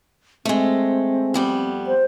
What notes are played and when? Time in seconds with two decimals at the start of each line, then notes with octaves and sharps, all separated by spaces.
0.45 G#3 A3 C4
1.34 F2 G3 B3
1.87 C5